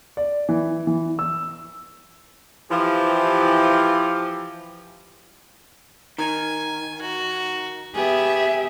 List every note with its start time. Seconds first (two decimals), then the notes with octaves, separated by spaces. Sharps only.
0.17 D5
0.49 E3
0.87 E3
1.19 E6
2.71 E3 F3 G4
6.18 D#3 G#5
7.01 F#4
7.95 B3 G4 G#4 E5